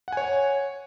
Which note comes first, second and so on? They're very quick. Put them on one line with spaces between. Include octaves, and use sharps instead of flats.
F#5 G#5 C#5